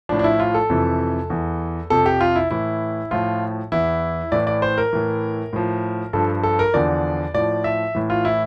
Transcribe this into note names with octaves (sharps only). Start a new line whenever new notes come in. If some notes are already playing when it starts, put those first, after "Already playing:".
A2 F3 D4
D4
E4
F4
A4
F2 C3 E3
E2 E3
F2 C3 F3 A4
G4
F4
E4
A2 E3 E4
A2 F3 F4
E2 E3 E4
A2 E3 D5
D5
C5
A#4
A2 E3
A2 F3
G2 F3 A4
A4
A#4
E2 D3 F3 D5
A2 F3 D5
E5
A2 E3
F4
E4